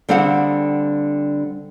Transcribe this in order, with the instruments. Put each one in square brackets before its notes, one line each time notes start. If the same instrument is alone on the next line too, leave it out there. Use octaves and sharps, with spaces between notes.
[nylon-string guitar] D3 G3 C4 G#4 F5 F#5